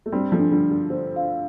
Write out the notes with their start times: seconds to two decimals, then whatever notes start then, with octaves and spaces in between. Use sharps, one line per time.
0.06 A3
0.12 G3 C4 D4
0.32 F3 A3
0.39 D4
0.51 D3 G3
0.65 D4
0.71 D3
0.90 D3 C5
1.16 F5